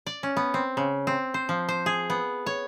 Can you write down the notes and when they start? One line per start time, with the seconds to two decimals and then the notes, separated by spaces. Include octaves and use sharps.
0.07 D5
0.23 C#4
0.37 B3
0.54 C4
0.77 C#3
1.07 C4
1.34 C5
1.49 F3
1.69 C5
1.86 G#4
2.10 B3
2.46 C#5